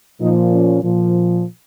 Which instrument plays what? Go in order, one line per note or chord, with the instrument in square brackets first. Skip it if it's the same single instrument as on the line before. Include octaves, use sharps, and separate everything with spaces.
[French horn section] A#2 F3 D#4
C#4
A#2 F3